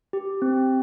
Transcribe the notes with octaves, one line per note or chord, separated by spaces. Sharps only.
G4
C4